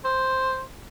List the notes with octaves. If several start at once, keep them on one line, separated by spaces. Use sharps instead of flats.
C5